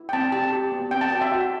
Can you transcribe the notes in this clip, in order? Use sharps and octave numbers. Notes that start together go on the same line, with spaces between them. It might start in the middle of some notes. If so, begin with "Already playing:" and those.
Already playing: E4
G5
C4 A5
G4 A5
G4
B3
C4 G5
A5
F#4 G5
E5
F#4